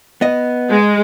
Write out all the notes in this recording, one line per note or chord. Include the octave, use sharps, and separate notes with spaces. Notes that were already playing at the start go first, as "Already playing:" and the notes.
B3 D#5
G#3